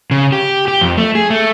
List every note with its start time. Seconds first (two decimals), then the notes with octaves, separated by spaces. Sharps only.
0.11 C#3
0.32 G4
0.68 G4
0.81 F2
0.97 A3
1.15 G#4
1.30 A3